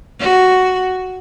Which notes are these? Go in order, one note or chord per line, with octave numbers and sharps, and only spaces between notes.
F#4